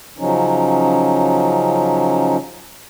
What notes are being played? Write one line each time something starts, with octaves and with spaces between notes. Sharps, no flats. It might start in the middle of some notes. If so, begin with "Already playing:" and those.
C#3 F3 F#3 C#4 D#4